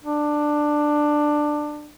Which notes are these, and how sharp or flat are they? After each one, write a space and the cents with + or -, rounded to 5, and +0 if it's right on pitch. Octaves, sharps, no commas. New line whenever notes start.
D4 +15